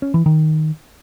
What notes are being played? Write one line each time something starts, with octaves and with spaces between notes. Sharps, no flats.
C#4
E3
D#3